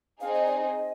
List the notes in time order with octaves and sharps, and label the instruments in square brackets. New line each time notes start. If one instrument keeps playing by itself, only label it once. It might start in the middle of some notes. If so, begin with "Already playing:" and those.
[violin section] C4 D#4 G#4 [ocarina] F5
[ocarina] D#5
D5
D#5